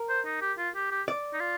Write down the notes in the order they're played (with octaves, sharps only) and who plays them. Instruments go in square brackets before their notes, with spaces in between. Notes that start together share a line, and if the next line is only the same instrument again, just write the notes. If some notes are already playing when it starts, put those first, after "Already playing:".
Already playing: [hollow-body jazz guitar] A#4
[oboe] C5
D#4
G4
F4
G4
G4
[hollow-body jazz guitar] D5
[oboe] D#4
F4